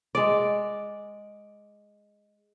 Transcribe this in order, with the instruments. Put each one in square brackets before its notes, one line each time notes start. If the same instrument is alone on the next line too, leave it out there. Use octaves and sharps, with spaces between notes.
[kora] G#3 D5